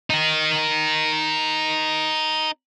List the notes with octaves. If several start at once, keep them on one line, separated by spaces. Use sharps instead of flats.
D#4 A#4